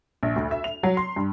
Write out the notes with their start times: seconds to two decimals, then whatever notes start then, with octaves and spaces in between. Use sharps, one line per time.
0.23 A#1
0.36 D2
0.51 E5
0.64 F7
0.83 F#3
0.97 C6
1.16 G2